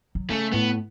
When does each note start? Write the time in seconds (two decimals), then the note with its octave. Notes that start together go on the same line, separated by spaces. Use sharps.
0.15 F#3
0.30 C#3 A3
0.52 A2 B3